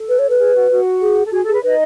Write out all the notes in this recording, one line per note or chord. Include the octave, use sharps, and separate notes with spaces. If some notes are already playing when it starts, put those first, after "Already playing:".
Already playing: A4
B4
C#5
B4
G#4
F#4
F#4
G#4
A4
F#4 G#4
A4
G#4 B4
D#4 B4 D#5